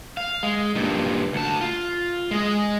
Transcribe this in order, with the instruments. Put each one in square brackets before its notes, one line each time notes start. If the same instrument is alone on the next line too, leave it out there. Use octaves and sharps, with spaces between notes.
[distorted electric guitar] F5
G#3
G2 A#2
D2 A5
F4
G#3 D#5